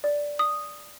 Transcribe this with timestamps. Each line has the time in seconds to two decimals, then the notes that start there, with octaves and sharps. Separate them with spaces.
0.04 D5
0.39 D#6